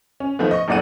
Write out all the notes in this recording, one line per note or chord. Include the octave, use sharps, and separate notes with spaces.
C#4
D#3 F3 A3 B3
D#5 C#6
A#1 F#2 A2 D5 F#5 D#7